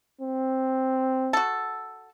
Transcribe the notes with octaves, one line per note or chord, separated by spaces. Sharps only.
C4
F#4 A4